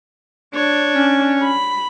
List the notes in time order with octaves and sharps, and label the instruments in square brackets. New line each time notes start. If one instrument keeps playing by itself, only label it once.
[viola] D4 [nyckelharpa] C#5
[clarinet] C#4
[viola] B5